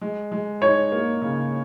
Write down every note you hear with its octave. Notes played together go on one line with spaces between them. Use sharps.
G#3
G#3
D#4 C#5
A#3
C#3